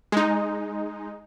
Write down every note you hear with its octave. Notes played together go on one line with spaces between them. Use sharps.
G#3 D#4